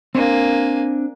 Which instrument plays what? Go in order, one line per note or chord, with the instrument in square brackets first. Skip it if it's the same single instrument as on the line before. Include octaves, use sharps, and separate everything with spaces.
[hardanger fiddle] A#3 G#5 [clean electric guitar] C4 D4